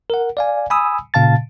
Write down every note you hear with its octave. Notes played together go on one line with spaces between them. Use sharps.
A#4 F#5
D5 F5 G#5
G#5 B5 D#6 E6
A#2 C#3 F5 A5 A6